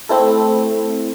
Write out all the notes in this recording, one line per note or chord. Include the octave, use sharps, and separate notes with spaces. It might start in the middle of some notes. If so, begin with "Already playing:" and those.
A3 C4 E4 A4